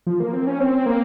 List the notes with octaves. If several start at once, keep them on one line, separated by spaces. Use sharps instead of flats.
F3
A#3
C4
C#4
C4
A#3